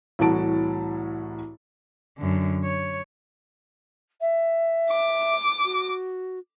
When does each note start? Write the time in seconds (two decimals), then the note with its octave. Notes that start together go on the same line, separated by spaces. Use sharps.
0.19 C2 A2 E3 F#4 A5 D7
2.18 F#2 D3
2.64 C#5
4.20 E5
4.91 D6
5.64 F#4